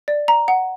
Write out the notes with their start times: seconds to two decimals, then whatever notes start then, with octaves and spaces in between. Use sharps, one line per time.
0.08 D5
0.28 A#5
0.48 F#5